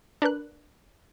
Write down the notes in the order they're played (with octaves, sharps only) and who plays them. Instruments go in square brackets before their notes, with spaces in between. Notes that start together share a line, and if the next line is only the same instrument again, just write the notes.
[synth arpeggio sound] D4 A#4 B4 F#6